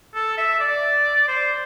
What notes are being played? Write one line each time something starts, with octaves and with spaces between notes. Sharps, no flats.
A4
E5
D5
C5